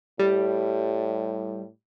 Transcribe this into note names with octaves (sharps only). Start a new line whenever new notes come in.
A2 G3